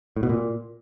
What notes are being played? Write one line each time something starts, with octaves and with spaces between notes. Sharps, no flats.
A2
B2
A#2